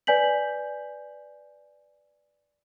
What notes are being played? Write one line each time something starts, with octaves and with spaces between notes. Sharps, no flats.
B4 D5 G#5 G6 B6 F#7